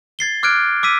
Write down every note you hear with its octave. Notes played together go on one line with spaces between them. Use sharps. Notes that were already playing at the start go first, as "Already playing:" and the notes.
G#6 A6 C7 G7
D6 F6 F#6 G#6 D7
D6 E6 B6 D#7